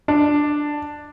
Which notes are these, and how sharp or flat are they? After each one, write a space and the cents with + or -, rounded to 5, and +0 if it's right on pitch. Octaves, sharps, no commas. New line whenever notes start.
D4 +10